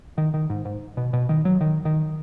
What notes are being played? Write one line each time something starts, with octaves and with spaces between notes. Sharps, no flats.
D#3
D#3
G#2
G#2
B2
B2
D#3
F#3
D#3
D#3